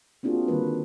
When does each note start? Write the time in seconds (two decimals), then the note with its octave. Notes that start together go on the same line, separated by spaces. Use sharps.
0.23 A#3 C4 D4 F4 F#4 G#4
0.48 D3 D#3 G3 A#3 B4